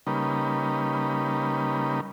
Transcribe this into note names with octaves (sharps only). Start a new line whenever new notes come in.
C#3 G3 A#3 D#4 B4